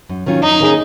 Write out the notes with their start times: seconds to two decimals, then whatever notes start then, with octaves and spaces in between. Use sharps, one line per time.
0.09 F#2
0.26 D#3 F#3 C#4 F4
0.43 F#2 D#4
0.60 D#3 A#3 C#4 G#4